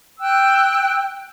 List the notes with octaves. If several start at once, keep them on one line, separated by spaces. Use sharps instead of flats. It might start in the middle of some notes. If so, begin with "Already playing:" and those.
G5 E6 F#6